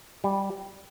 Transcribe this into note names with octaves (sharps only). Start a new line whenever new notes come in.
G3